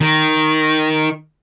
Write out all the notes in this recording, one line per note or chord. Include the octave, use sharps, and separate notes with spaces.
D#3